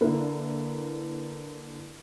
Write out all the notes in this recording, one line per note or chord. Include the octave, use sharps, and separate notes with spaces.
D3 A#3 E4 A#4 B4